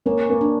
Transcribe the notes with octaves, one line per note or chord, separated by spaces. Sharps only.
A#3 C#4
A#3
D4